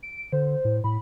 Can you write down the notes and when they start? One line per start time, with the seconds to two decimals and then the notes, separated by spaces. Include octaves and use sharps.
0.03 D7
0.32 D3 C5
0.65 A2
0.84 A2 B5